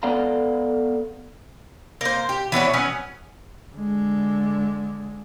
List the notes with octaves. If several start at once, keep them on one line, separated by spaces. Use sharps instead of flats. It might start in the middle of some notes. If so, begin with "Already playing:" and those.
B3 A4 D5 F5 F#5 A#5
A#3 C5
G4
E3 B3 D4 C#5
F#3 B3 C#4
D3 G#3